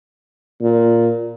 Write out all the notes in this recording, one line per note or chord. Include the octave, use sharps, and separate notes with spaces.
A#2